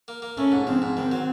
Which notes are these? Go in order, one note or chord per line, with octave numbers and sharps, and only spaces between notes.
A#3
A#3
A3 C#4
G#2
F3 C4
G#2
D#3 C4
F#3